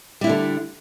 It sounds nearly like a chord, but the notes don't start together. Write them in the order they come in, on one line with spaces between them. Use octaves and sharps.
G3 E4 D4 D3